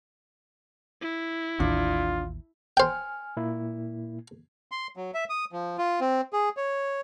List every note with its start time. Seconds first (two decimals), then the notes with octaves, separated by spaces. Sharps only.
1.02 E4
1.60 A1 D#2 D4 F4
2.77 C5 G5 G#5 F6
3.37 A#2 A#3 E4
4.72 C6
4.96 F#3
5.14 E5
5.30 D#6
5.52 F3
5.78 F4
6.00 C4
6.33 G#4
6.57 C#5